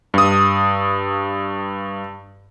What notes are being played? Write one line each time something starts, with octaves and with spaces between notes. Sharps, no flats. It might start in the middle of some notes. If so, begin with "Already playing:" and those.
G2 D#6